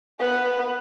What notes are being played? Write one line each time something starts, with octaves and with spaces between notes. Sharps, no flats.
B3 B4